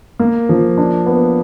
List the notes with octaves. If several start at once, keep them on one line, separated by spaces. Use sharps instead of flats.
A#3
F3
D4
B3